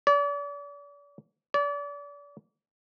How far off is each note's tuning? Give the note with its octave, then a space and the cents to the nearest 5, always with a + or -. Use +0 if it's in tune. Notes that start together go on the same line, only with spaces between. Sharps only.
D5 -40
D5 -35